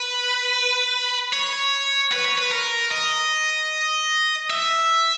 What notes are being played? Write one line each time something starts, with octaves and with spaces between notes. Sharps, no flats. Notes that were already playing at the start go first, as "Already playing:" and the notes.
Already playing: B4
C#5
B4
C#5
B4
A#4
D#5
E5